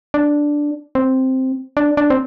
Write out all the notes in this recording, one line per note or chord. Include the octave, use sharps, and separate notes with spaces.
D4
C4
D4
D4
C4